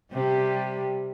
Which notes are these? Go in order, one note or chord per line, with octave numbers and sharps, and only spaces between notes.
C3 G3